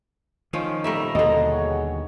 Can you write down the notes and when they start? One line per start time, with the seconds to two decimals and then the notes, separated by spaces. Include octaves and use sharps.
0.53 D#3 F3 C#4
0.84 F2 A#2 G3 A3 E5 A#5
1.15 D#2 B2 D3 D#5
1.46 F#4 G#4 C#5